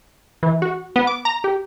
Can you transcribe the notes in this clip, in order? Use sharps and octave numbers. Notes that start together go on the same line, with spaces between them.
E3
F#4
B3
D6
A#5
G4